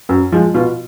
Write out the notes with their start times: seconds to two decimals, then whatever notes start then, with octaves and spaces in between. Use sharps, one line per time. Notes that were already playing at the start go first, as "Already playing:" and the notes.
0.09 F#2
0.32 F3 G#3
0.54 B2 F4